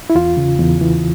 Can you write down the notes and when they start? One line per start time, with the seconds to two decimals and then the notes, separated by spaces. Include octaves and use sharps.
0.10 E4
0.15 E2 F4
0.37 C#3
0.59 E2
0.81 E3